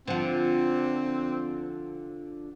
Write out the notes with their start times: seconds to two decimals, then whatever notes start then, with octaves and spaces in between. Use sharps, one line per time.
0.08 D3 F3 C4